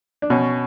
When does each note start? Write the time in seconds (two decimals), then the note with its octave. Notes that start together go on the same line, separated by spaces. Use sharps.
0.22 D4
0.30 B2 C#4